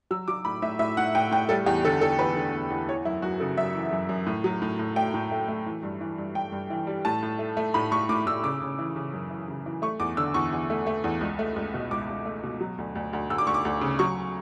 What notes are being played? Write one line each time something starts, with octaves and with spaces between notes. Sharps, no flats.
F#3 E6
F#3 D6
A2 B5
A2 E5
A2 E5
A2 F#5
A2 G5
A2 G5
G3 A4
E2 G4
D3 A4
E2 A4
E2 B4
D3
E2
E2
E3 C#5
F#2 E4
F#2 F#4
C#3 A4
F#2 E5
E3
F#2
F#2
A2
F#3
A2
A2
A3 G5
A2
A3
A3
E3
G2
E3
G2
G2 G5
G2
E3
G3
A2 A5
A2
A3
A3
A2 B5
A2 C#6
A2 D6
A2 E6
C#3 D6
C#3
E3
C#3
F#2
E3
C#3
E3
A3 C#6
E2 D6
D3 E6
E2 C#6
E2
A3
A3
E2
C#2
A3
C#2
B2
C#2 D6
C#2
A3
B2
F#3
D2
D2
D2
D2 E6
D6
D2 C#6
D6
D2
C#3
F#3 C#6